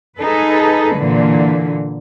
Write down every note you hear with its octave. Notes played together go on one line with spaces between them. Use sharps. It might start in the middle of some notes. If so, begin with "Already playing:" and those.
D#4 G#4 A4 B4
A#2 D3 E3